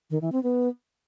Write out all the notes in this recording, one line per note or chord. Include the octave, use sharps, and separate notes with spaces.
D#3
E3
C4
B3